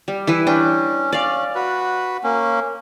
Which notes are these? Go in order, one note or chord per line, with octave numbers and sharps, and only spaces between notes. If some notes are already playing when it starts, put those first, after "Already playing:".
G3
E3 E4 B4
C#4 D4 G5
C#4 D5 F5
F#4 B4
A#3 C#4